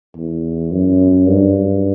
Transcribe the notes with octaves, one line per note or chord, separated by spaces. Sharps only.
E2
F#2
G2